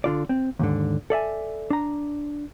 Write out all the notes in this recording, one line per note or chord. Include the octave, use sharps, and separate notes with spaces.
D3 F4 D5
C4
D#2 G#2 D3
A4 D5 E5 G#5
D4 A#5